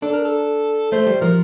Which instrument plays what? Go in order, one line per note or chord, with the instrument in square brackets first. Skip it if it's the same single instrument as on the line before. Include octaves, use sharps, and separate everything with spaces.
[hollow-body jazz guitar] D4 [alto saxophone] A4
[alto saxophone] A#4
A4
[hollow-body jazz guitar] A3 [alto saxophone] C5
[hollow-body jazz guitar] G3
[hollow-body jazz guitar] F3 [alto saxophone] A#4